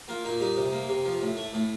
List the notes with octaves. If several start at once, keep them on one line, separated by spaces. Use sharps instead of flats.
A#3 F4
A#2 D#4
G3 D#4
C3
A#3
C3
F3
A2
A3
A2